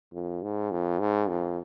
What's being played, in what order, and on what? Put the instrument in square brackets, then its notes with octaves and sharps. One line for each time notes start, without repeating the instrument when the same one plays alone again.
[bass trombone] F2
G#2
F2
G#2
F2